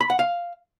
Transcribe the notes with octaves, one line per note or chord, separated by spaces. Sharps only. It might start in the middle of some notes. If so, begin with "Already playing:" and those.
B5
F#5
F5